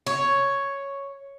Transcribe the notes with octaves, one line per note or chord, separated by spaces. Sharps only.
C#5